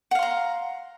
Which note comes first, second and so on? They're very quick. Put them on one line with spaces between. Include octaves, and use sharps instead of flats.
F#5 F5 C6 A#5